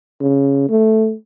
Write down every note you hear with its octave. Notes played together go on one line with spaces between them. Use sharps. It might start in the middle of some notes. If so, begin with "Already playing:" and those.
C#3
A3